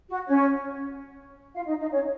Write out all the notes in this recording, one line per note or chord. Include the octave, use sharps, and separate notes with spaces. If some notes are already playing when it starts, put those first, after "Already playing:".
F#4
C#4 C#5
F4 F5
D#4 D#5
D#4 D#5
C#4 C#5